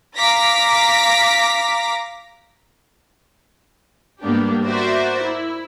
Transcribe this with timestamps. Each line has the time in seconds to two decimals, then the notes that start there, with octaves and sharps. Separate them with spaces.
0.17 F5 A#5 D6 A#6 B6
4.21 G#2 G3 A#3 B3 D4 G4
4.64 F#4 A#4 C5 D5 E5
5.23 E4